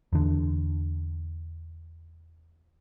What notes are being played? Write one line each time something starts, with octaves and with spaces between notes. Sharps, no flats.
E2 D3